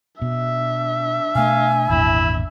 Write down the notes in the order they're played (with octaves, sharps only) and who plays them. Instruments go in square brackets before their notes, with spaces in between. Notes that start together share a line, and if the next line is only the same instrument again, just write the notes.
[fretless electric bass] B2 [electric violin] D4 E5
[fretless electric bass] B2 A3 [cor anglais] F5 [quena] G#5
[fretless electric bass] G#1 E2 A#2 [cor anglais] E4